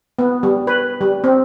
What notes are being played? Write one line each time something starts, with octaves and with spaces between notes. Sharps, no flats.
B3
G3
B4
G3
C4